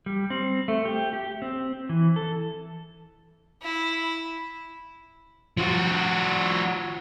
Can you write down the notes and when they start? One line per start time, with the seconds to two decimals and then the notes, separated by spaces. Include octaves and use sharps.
0.06 G3
0.30 C4
0.68 A3
0.85 G4
1.13 G4
1.42 C4
1.89 E3
2.16 A4
3.62 E4
5.57 F3 F#4